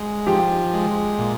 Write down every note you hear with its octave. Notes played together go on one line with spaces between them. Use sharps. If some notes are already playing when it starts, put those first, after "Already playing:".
Already playing: G#3
F3 G4
G#3
A#2